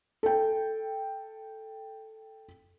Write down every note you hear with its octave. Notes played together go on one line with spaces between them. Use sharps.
A4 G5